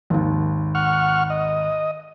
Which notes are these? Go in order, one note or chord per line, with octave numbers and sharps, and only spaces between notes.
G#1 D#2
F#5 C#6 F6
D#5